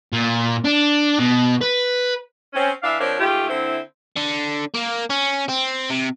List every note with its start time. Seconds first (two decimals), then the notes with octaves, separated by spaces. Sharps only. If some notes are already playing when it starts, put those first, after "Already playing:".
0.13 A#2
0.65 D4
1.19 B2
1.62 B4
2.54 C4 C#4
2.82 E3 D4 E5 F5
3.00 F3 C4 D4 A#4 C#5
3.19 G#2 A3 F4 G4
3.48 D3 C4 E4
4.16 D3
4.74 A#3
5.10 C#4
5.49 C4
5.90 C3